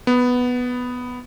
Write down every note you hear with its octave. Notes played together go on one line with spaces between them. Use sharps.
B3